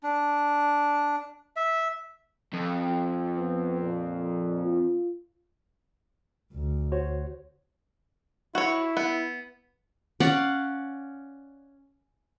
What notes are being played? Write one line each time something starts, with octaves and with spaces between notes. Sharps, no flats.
D4
E5
F2
F3
B3
A#2
F4
D2
F#4 C5 C#5
E4 F#4 C#5
B3
C#4 D5 F5 F#5